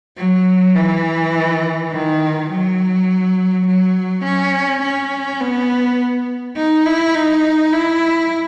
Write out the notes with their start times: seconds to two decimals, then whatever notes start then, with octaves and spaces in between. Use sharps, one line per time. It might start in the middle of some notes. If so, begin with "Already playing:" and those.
0.18 F#3
0.75 E3
1.92 D#3
2.50 F#3
3.66 F#3
4.24 C#4
4.82 C#4
5.41 B3
6.57 D#4
6.85 E4
7.15 D#4
7.73 E4